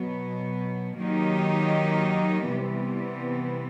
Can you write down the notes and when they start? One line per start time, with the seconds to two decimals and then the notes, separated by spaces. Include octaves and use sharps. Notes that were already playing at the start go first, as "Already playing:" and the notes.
Already playing: B2 F#3 B3
1.00 D#3 F#3 A#3 D#4 G4
2.48 C3 E3 G3 B3